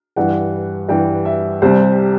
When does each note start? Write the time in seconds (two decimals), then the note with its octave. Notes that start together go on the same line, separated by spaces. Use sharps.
0.16 G2 E3 G3 F#5
0.89 G2 E3 G3 G5
1.25 E5
1.62 C2 C3 G3 C5